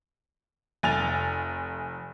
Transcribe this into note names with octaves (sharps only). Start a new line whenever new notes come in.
F1 G#5 A6 F7